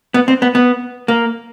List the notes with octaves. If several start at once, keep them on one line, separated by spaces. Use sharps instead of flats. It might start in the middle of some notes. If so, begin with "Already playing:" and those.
B3
C4
B3
B3
A#3